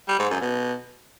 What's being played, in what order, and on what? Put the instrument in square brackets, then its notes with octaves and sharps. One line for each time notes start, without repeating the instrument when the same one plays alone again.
[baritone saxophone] G3
G#2
F#2
B2